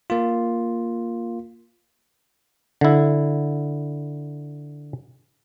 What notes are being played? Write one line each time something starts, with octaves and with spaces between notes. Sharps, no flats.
A#3 F4
D3 E4